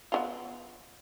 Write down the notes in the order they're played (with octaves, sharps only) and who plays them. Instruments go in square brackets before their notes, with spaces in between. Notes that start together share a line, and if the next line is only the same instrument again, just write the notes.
[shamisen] B3 E4 F4